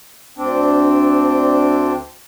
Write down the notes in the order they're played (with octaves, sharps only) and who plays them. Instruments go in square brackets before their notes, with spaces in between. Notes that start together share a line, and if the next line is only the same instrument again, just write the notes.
[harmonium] D2 C4 D4